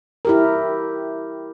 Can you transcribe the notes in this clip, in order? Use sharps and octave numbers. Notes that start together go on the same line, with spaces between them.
E4 G4 A#4